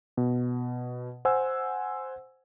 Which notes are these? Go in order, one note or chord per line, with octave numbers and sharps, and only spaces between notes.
B2
C5 F#5 G#5 E6